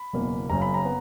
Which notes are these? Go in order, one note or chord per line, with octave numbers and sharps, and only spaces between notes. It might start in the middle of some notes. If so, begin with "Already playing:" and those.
Already playing: B5
F#1 E2 B2 A#3
F#1 F#2 C#3 A#5
B5
A#5
B3